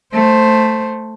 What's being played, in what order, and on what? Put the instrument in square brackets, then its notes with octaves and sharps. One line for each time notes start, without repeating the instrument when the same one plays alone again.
[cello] A3 C5